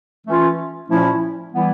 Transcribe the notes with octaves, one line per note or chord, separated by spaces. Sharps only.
E3 A3 C#4 F4
A#2 F3 A3 C#4 E4
E3 G3 B3 E4